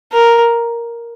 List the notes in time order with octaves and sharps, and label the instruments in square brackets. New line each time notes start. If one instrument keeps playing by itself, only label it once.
[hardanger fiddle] A#4